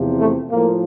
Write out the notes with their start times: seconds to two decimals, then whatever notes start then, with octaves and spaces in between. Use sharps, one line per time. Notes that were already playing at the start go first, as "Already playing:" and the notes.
Already playing: E2 C3 F3
0.20 A3
0.50 A2 F3 A#3